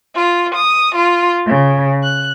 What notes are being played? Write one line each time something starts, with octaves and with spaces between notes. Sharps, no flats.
F4
D#6
F4
C#3
F#6